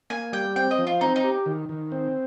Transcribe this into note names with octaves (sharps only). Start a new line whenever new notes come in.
A#3 G#5
G3 G5
C4 G5
D#5
F3
F4
C4 D#4
D#4
G4
D#3
D#3
C4